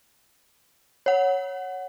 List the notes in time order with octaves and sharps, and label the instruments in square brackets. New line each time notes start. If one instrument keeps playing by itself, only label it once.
[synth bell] C#5 F#5